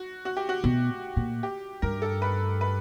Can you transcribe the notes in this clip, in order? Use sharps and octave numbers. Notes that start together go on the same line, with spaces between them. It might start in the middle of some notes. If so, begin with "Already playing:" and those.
Already playing: F#4
F#4
G4
F#4
B2
A#2
G4
G2 A#4
A4
B4
B4